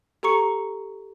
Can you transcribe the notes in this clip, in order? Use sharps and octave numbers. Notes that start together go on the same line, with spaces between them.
G4 A4 A#5 C#6 C#7